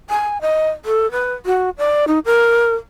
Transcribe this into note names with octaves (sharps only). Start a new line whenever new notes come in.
G#5
D#5
A4
B4
F#4
D5
D#4
A#4